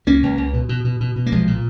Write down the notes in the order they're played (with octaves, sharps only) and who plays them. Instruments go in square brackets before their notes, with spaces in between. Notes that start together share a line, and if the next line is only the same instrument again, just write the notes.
[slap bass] C#2 A#3 C#4
C#2
C#2
B2
B2
B2
B2
B2
A#3
B1 F3 G#3
A#2